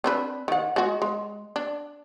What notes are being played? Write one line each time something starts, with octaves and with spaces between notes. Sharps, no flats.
C4 D4 B4
D#3 F#5
G#3 F#4
G#3
D4